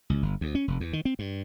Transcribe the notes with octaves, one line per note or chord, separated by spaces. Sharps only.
C#2
G1
D2
C#4
F1
E2
D#3
C4
G2